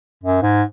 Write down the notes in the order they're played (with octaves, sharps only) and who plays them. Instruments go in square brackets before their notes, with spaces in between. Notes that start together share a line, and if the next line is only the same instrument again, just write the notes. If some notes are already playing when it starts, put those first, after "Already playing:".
[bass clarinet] F#2
G#2